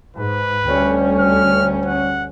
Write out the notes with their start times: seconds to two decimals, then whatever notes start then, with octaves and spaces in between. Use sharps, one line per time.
0.16 G#2 B4
0.67 D2 G3 C#4
1.20 F6
1.85 F#5